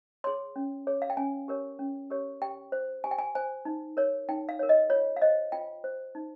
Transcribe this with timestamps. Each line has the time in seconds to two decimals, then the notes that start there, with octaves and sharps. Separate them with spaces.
0.24 G#4 C#5 C6
0.56 C#4
0.87 G#4 C#5
1.02 F5
1.10 G5
1.17 C#4 G#5
1.48 G4 A#4 C#5
1.79 C#4
2.10 G4 A#4 C#5
2.42 G4 G5
2.72 C5
3.04 G4 G#5
3.11 G5
3.18 G#5
3.35 C5 G#5
3.65 D#4
3.97 A#4 C#5
4.29 D#4 G5
4.49 F5
4.59 A#4 C#5
4.69 D#5
4.90 F4 C#5
5.17 F5
5.21 C5 D#5
5.52 F4 G5
5.84 C5
6.15 D#4